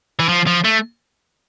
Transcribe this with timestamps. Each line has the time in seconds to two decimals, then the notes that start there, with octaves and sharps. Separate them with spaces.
0.19 E3
0.29 F3
0.47 F3
0.64 A3